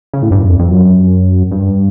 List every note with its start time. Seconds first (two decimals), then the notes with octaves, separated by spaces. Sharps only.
0.13 C#3
0.22 A2
0.31 G2
0.39 F#2
0.48 F2
0.59 F2
0.71 F#2
1.51 G2